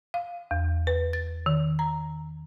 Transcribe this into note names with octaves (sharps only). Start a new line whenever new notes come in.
F5
E2
B4
A6
D#3
A#5